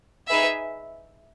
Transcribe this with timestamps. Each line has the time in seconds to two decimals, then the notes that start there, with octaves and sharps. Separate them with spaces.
0.28 D#4 G#4 B4 E5